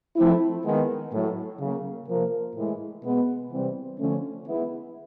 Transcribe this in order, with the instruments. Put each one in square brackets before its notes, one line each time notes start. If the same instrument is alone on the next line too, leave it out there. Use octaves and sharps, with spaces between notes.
[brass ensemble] F3 A3 C4 E4
D#3 G#3 B3
A2 F#3 A3
C#3 F#3 A#3
C3 F3 A#3
A2 E3 G#3
B2 G#3 B3
C3 E3 G3 C4
D3 F3 A3 C#4
E3 G#3 B3 E4